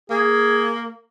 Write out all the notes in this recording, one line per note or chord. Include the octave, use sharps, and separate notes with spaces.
A#3 G#4